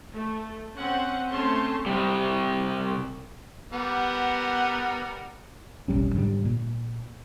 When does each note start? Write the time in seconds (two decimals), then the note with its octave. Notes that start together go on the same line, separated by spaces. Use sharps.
0.13 A3 A4
0.76 C4 C#4 F#5
1.31 A3 C4 C#4 A5 C6
1.86 C3 G3
3.73 G3 B3 A#4 F#5
5.88 F1 B1 G3 C#4
6.15 G#2 D3 E3 G3
6.45 A#2